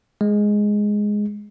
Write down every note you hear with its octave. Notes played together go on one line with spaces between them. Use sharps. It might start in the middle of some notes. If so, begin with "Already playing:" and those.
G#3